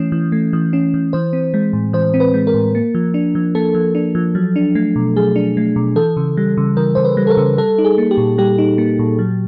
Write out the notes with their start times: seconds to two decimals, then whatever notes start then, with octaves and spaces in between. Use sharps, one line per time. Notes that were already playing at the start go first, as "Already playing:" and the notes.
Already playing: E3 A3 C#4
0.12 E3
0.32 A3
0.53 E3
0.73 C#4
0.94 E3
1.13 E3 C5
1.33 C4
1.54 G#3
1.73 A2
1.93 E3 C5
2.14 C4
2.20 B4
2.34 G#3
2.47 A#4
2.54 A2
2.75 A#3
2.95 F3
3.14 D4
3.35 F3
3.55 A#3 A4
3.75 F3
3.95 D4
4.15 F3
4.35 F#3
4.56 D4
4.75 A3
4.96 B2
5.16 F#3 G#4
5.36 D4
5.57 A3
5.76 B2
5.96 E3 A4
6.17 C#3
6.37 G3
6.57 C#3
6.77 E3 A#4
6.95 C#3 C5
7.05 B4
7.17 G3
7.27 A4
7.30 A#4
7.37 C#3
7.58 G3 A4
7.78 D#4
7.84 G#4
7.98 A#3
8.11 G4
8.18 A#2
8.38 G3 G4
8.58 D#4
8.78 A#3
8.99 A#2
9.19 F#3